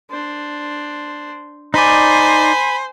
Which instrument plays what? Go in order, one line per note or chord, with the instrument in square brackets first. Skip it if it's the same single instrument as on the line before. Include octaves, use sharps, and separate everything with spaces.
[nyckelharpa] D4 C5
[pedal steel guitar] D#4 D5 [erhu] C5 [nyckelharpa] G#5 [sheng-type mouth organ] B5